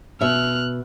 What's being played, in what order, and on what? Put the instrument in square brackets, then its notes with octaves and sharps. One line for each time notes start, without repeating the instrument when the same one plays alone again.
[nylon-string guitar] B2 E5 [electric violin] F6 F#6